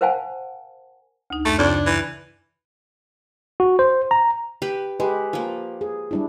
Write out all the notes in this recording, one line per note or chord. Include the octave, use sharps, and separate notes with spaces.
A#4 C5 F5 F#5 G#5 A5
D2 D#4
F#2 A3
F2 C#3 D4
E3
F#4
C5
A#5
G4 B4 B5
G#3 G4 B4
F3 A#3
G#4
G3 D4 E4